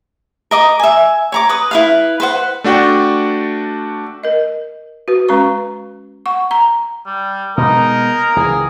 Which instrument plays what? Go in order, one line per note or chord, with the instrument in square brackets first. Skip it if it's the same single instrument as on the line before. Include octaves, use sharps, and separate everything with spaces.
[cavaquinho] A#4 D#5 D6
E5 G#5
C#5 A#5 D6
B4 D#6
E4 B4 F5
B4 C5 F#5
[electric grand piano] A3 D4 F#4 D5 G5
[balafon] A#4 D#5
F#4 B4
G#3 C#4 B4 A#5 C#6
F#5 C#6
A#5
[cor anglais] G3
[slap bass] B2 G#3 [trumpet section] A#3 A#4 [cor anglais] D#4
[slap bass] C#2 E3 [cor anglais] G#4